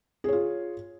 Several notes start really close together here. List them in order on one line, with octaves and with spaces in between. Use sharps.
G#4 C#5 F4